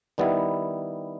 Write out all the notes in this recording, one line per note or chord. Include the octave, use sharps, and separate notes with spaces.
D#3 G3 B3 E4